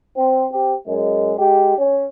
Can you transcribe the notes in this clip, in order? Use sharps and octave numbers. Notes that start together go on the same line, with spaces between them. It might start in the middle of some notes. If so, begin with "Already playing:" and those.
C4
C4 G4
F#2 G#3
G#3 G4
C#4